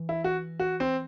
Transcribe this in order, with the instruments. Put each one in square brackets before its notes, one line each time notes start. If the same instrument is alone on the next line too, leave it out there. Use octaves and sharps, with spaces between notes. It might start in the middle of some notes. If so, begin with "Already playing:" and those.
Already playing: [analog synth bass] E3
[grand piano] E4
F#4
F#4
C4